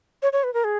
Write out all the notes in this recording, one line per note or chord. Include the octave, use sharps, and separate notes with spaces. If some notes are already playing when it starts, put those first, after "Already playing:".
C#5
C#5
B4
A#4
G#4